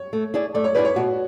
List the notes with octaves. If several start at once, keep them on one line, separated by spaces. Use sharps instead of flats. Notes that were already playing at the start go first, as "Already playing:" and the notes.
Already playing: C#5
A3
E4 G#4 D5
A3 D5
C#5
E4 G#4 B4 D5
C#5
B2 F#4